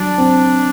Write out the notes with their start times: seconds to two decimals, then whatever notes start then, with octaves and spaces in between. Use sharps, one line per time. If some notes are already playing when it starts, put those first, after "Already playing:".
Already playing: F#3 D4
0.18 C4